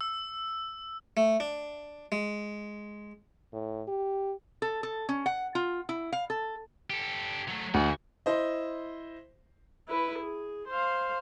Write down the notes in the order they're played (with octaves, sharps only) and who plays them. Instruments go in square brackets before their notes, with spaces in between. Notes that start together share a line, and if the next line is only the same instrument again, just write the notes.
[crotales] E6
[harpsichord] A3
D4
G#3
[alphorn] A2
G4
[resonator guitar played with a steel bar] A4
A4
C#4
F#5
F4
E4
F5
A4
[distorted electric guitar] G4 A4
F#3 A3
[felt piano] D2 [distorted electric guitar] F#4 G#4
[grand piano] E4 C5 D#5
[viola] E4 B4
G#4
C5 F5